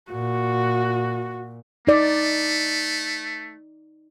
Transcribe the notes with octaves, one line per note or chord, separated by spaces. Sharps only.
A#2 F#4
A3 D#4 D5